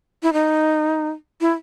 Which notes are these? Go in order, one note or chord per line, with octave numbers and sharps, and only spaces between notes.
E4
D#4
E4